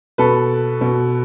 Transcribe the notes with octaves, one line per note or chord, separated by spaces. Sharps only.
B2 A4 B4
B2